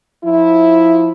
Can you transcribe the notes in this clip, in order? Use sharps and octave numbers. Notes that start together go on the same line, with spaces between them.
F3 E4